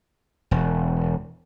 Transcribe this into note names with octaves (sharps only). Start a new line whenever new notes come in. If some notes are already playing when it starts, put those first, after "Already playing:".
E1